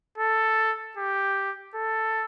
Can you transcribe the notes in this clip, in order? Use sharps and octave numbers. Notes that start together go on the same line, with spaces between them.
A4
G4
A4